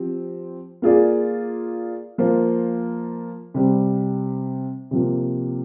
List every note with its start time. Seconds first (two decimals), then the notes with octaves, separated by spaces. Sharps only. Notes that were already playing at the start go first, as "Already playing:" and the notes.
Already playing: F3 C4 G4
0.82 A#3 F4 G#4 D5
2.18 F3 A#3 F4 C5
3.54 C3 G3 C4 G4
4.91 C3 F3 A#3